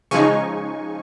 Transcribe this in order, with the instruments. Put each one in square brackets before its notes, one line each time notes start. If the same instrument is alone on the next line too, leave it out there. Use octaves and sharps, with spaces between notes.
[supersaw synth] C#3 F3 G#3 D#4 G#5 C#6